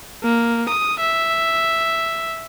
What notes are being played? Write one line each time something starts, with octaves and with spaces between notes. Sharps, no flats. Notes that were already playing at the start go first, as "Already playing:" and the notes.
A#3
D#6
E5